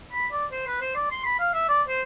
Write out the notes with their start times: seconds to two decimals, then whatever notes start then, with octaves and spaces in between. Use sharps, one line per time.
0.13 B5
0.32 D5
0.52 C5
0.67 B4
0.81 C5
0.96 D5
1.11 C6
1.25 B5
1.40 F5
1.54 E5
1.69 D5
1.88 C5